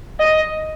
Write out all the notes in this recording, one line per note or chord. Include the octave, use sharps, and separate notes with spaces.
D#5